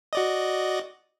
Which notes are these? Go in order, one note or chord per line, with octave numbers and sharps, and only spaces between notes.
F#4 D5 D#5